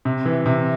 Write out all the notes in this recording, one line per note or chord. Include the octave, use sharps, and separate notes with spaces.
C3
E3
C3